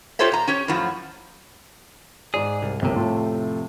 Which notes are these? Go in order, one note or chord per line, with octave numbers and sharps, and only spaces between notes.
F4 G4 A4 C5 C#5 E5
A#2 A#5
C#4 G4 C#5
F#2 A2 F3 F#3
G#2 G#4 D5
C2
G1 C2 F2 C3 A#3
A2 A3 F4